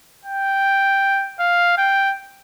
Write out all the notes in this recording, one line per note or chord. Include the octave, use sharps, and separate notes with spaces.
G5
F5
G5